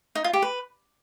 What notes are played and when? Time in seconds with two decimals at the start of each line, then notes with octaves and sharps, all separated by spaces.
0.15 D#4
0.24 F4
0.33 G4
0.42 B4